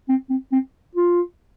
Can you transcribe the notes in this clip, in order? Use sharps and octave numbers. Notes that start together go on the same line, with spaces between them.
C4
C4
C4
F4